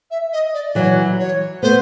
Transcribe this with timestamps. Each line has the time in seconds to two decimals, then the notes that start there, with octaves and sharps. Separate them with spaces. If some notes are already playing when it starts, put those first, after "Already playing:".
0.11 E5
0.33 D#5
0.53 D5
0.75 E3 F#3 C#5
1.19 C#5
1.62 A3 B3 C5